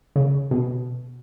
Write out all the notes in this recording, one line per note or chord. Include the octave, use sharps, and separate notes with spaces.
C#3
B2